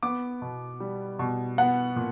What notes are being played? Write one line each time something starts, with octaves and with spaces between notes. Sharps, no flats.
B3 D6
B2
G3
B2
B3 F#5
A#2